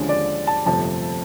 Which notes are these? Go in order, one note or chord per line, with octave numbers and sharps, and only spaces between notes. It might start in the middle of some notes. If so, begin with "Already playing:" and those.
Already playing: D#2 D3 F3 G#3 C#4
D5
A5
G1 F2 C3 F3 A3 A5